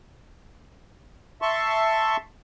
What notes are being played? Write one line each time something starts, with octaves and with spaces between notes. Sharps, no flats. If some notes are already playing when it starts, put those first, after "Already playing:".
E5 A5 C6 C#6